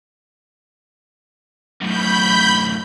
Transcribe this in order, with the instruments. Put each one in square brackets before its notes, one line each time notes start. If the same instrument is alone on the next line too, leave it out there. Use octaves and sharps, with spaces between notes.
[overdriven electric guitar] F#2 A2 [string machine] B5 G6